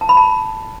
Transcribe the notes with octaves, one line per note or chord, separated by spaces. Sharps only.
A5
B5
A5